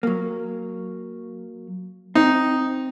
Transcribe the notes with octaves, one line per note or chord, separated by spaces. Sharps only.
F#3 A#3
C4 D#4